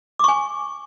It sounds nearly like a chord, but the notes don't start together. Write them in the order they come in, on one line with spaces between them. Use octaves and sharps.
D6 C#6 G#5